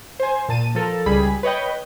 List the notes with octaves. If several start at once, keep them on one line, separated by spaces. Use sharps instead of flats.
C5 G#5
A#2 A5 D#7
F3 A4 A#4
C#2 G3 G#4 B5
B4 C#5 D#5 G5